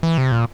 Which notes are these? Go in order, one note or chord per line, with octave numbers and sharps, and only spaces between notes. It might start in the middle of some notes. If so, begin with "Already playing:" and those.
E3
C3
A#2